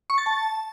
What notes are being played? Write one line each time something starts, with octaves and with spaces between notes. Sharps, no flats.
C#6
A6
A5